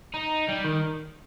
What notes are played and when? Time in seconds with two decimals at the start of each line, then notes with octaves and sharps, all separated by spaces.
0.14 D#4
0.48 G3
0.64 D#3